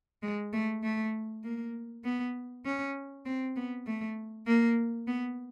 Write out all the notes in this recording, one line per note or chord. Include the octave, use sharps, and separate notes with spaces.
G#3
A3
A3
A#3
B3
C#4
C4
B3
A3
A#3
B3